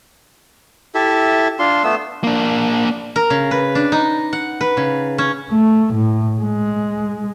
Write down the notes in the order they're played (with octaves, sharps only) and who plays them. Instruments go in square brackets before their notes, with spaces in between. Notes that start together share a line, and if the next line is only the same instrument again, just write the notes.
[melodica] E4 G4 A4 E5
D4 F4 C6
A3 B3 E6
[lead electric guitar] A#3 D4
[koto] A#4
C#3
B4
D4
D#4
F#5
B4
C#3
C#4
[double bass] A3
A2
G#3